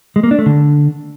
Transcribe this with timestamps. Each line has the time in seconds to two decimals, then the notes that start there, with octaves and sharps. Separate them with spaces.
0.16 G#3
0.23 A#3
0.31 D4
0.39 A3
0.46 D3